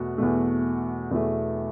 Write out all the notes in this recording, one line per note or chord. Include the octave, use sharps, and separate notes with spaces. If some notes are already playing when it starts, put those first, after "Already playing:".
Already playing: E2 B2 A3 F#4
E2 B2 A3
E2 B2 A3